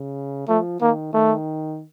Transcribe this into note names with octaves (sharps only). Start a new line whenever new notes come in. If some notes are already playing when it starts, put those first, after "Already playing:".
Already playing: C#3
F3 A3
D#3 A#3
D#3 A3